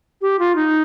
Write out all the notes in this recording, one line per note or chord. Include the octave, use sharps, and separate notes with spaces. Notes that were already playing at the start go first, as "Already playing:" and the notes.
G4
F4
D#4